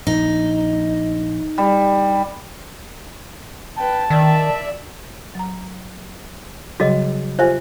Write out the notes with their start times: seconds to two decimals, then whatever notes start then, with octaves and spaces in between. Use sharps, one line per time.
0.07 A#1 D#4
1.58 G3
3.77 B4 G5 A5
4.10 D#3 D5 E5
5.35 F#3 A#5
6.80 C#3 F#3 G3 F#4 G#4 D#5
7.39 F4 G4 C5 E5 G#5